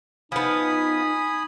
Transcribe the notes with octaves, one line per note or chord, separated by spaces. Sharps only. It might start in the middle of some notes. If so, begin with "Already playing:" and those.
F3 B3 D#4 G#5 B5 D#6